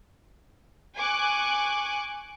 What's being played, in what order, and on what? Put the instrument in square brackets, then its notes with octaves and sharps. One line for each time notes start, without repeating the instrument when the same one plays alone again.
[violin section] G#5 C#6 D6 F#6